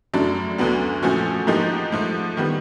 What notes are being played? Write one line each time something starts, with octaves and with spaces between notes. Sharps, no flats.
F#2 C#3 F#3 A3 D4
D2 D3 F#3 B3 D4
A#2 F3 A3 C#4 F#4
G#2 F3 A#3 D#4 G4
G#2 F3 A3
D#3 G3 B3